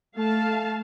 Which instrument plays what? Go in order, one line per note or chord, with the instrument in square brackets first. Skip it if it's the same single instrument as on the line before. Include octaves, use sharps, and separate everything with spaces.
[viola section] A3 F5 A5